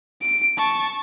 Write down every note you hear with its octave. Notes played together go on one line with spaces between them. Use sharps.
D7
A5 C#6